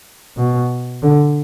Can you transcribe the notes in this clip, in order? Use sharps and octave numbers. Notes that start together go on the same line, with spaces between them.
B2
D3